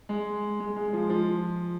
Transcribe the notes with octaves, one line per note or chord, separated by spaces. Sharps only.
G#3
G#3
G#3
F3
F3